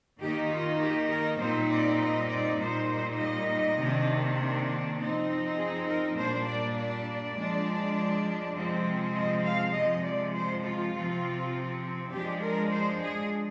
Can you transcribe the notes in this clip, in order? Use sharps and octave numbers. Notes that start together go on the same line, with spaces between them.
D#3 A#3 D#4 G4
F4
G4
A#4
A#2 G3 C4 D#4 C5
D5
D#5
D5
A#2 G3 A#3 D#4 C5
D#5
C3 D#3 A#3 D4
F3 C4 D#4
G#4
A#4
A#2 G3 A#3 D4 C5
D5
D5
F3 G#3 D4
C3 F3 G#3 C4
D#5
F5
C3 F3 G#3 D#5
D5
C5
F4
C3 F3 C4
F3 G#3 D4 G4
A#4
C5
G#4